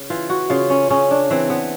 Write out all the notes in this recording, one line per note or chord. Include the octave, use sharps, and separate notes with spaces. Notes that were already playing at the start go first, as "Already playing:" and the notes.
Already playing: C#3
E3 F4
F#4
C#3 F4
C#4
C#3 C#4
D4
E3 C4
B3